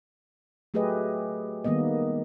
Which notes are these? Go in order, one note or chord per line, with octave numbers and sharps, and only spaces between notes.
F#3 A3 G4 G#4 B4 D#5
D#3 G3 A#3 B3 D#5